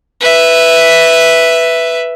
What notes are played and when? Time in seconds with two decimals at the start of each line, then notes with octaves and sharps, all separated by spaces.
0.21 B4 E5